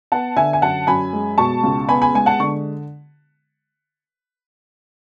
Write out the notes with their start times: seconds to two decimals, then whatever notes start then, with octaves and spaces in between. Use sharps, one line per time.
0.12 B3 F#5 A5
0.36 D3 E5 G#5
0.53 G#5
0.62 F#2 F#5 A5
0.87 F#2 G#5 B5
1.13 G#3
1.38 B2 A5 C#6
1.63 C#2
1.88 B3 G#5 B5
2.02 G#5 B5
2.14 G#3 G#5
2.26 F#5 A5
2.39 D3 C#6